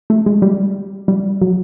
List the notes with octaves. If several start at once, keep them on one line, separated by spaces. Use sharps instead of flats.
A3
G#3
G3
G3
F#3